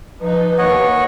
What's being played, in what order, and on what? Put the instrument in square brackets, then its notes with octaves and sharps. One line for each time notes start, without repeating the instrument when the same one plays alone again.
[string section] F3 D#4 [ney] B4
[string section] D#2 [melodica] C#5 D#5 F#5